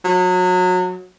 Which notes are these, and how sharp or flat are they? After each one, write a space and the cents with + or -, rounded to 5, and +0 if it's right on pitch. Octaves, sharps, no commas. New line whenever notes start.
F#3 -25